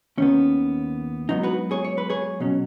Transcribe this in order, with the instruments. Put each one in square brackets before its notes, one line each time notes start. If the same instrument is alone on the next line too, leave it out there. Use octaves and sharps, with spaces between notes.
[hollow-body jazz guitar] D#2 D#3 B3 C#4
G#2 F#3 B3 D#4
F#4 B4
G#4 C#5
C#5
B4
G#4 C#5
B2 F#3 C#4